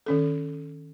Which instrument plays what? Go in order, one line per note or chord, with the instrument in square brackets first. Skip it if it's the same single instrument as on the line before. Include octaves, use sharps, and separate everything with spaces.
[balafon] D#3 C#4 A4